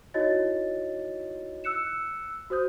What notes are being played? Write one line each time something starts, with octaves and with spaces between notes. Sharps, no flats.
D#4 E4 F#4 C#5 D#5 A6
E6 F#6 C#7 E7
F#4 C5 D#6 G6